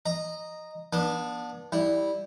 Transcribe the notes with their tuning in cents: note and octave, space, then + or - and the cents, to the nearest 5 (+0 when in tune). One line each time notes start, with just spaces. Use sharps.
D#5 -10 A#5 +0
B3 -40 D4 +0 D#6 -10
G3 +0 E4 -15